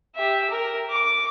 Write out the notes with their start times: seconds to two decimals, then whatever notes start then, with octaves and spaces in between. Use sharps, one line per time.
0.15 G4 E5
0.50 A#4
0.90 D6